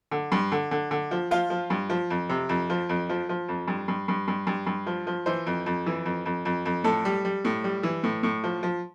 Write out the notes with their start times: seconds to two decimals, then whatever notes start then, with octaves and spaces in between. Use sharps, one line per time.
0.11 D3
0.32 G2
0.52 D3
0.71 D3
0.91 D3
1.11 F3
1.31 F3 F4
1.50 F3
1.70 G2
1.90 F3
2.10 F2
2.29 C3
2.49 F2
2.70 F3
2.89 F2
3.09 F3
3.29 F3
3.48 F2
3.68 G2
3.88 G2
4.08 G2
4.28 G2
4.47 G2
4.67 G2
4.86 F3
5.07 F3
5.26 E3 C5
5.47 F2
5.66 F2
5.86 E3
6.05 F2
6.26 F2
6.45 F2
6.65 F2
6.84 A2 A4
7.05 G3
7.25 G3
7.45 A2
7.64 G3
7.83 E3
8.04 A2
8.23 A2
8.44 F3
8.63 F3